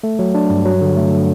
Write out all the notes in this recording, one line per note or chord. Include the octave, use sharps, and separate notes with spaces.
A3
F#3
D4
G2
F#3
D3
A3